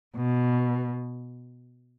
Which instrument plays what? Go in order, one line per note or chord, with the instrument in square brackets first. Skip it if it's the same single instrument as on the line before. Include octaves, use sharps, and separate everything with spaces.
[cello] B2